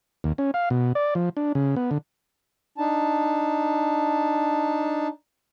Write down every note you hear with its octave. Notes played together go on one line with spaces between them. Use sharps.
D#2
C#4
F5
B2
D5
F3
D4
C#3
B3
D3
D4 D#4 A5